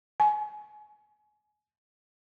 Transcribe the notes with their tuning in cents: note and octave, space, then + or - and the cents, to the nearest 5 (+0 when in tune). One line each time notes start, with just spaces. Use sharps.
G#5 +25